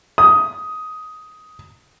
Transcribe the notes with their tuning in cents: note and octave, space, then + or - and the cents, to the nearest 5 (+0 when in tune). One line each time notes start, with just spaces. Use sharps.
D#6 +10